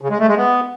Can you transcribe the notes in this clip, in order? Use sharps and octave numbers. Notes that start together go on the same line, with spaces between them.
C#3
G#3
A3
G#3
B3